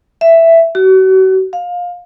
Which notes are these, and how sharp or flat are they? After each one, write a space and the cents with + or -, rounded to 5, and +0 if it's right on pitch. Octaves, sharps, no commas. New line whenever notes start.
E5 +5
F#4 +40
F5 +20